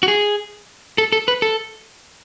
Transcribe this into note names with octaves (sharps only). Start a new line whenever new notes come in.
F#4
G#4
A4
A4
B4
A4